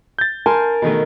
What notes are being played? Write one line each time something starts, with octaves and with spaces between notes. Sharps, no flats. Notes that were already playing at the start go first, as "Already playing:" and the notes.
G6 A6
A#4 G#5 A5 C6
B2 D#3 A3